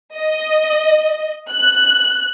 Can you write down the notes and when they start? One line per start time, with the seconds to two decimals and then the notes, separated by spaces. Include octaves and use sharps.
0.18 D#5
1.52 F#6